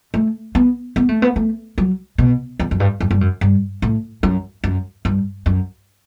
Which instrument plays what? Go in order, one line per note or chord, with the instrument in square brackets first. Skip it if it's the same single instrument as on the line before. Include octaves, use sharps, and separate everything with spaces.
[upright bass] A3
B3
B3
A3
B3
A3
F#3
B2
E2
F#2
G2
F#2
G2
F#2
G2
A2
F#2
F#2
G2
F#2